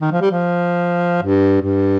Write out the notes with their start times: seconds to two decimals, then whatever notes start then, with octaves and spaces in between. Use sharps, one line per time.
0.01 D#3
0.11 F3
0.21 G3
0.31 F3
1.22 G2
1.61 G2